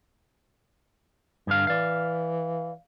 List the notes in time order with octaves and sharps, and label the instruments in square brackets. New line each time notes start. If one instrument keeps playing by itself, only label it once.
[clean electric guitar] G2 D3 F5
[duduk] E3 [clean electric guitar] D5 F5